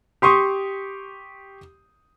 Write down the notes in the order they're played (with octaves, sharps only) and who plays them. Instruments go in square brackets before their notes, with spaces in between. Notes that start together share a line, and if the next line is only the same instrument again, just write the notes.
[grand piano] G4 C6 C#6 D#6